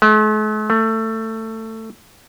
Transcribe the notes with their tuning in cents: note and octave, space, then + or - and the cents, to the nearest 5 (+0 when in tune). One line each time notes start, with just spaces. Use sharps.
A3 -45
A3 +20